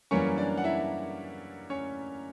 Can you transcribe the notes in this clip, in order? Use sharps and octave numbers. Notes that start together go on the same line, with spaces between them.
F#2 E3 G3 A#3 C#4 C#5
D4 D5
F#5
E4 E5
C#4 C#5